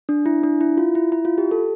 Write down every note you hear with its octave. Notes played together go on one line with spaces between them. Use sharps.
D4
E4
D4
E4
F4
E4
E4
F4
G4
A4